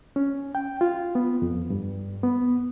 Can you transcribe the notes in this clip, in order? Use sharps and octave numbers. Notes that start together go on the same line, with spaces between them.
C#4
G5
F4
B3
F2
G2
B3